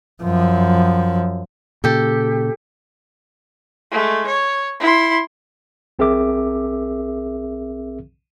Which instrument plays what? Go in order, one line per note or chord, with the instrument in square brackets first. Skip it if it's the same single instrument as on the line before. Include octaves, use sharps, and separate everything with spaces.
[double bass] F#2 F3
[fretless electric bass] A#2 C#3 [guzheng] G4 A4
[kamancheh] G#3 A3
C#5
E4 C6
[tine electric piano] B1 C4 G#4 A#4 E5 D6